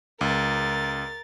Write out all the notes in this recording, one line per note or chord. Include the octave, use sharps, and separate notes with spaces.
C#2 A#4 A6